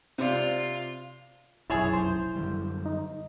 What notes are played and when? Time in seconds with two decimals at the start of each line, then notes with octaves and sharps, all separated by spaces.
0.18 C3 F4 D5
1.70 F1 B1 F#2 E4 G#4 C#5 A5
1.93 C5
2.36 F#2 D3 G3
2.86 D#4